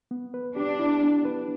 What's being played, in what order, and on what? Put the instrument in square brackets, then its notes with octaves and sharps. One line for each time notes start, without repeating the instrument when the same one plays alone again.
[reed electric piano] B3
B4
[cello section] D4 [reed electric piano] G4
[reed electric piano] E4
B3
B4